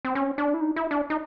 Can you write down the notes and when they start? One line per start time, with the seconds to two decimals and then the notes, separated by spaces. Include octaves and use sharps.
0.05 C4
0.15 C#4
0.38 D4
0.54 E4
0.61 D#4
0.76 E4
0.91 D4
1.10 D#4